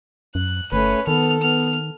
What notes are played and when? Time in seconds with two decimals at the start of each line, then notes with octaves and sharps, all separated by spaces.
0.35 F#2 F#6
0.72 G1 A3 C#4 B4
1.07 D#3 B3 A4 F6
1.42 B3 F6